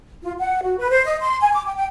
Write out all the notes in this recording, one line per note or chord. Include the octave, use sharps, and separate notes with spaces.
F4
F#5
F#4
B4
C5
D#5
C6
G#5
D6
G5
G5